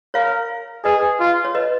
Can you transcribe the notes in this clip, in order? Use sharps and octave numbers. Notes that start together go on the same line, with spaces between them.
A#4 C#5 F5
G#4 B4 D#5
F4
C#5
B4 D#5